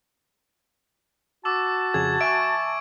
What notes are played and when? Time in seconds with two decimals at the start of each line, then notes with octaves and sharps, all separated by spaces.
1.45 F#4 A5 D6 E6
1.94 F2 C#3 G#4 G#6
2.21 E5 G#5 C#6 D7